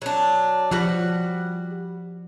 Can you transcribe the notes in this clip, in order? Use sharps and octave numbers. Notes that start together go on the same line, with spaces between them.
F#3 D4
F3 G3 F#4 F#5